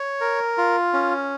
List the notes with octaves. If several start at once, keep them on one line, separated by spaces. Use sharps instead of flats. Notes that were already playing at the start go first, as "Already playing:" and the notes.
Already playing: C#5
A#4
F4
C#4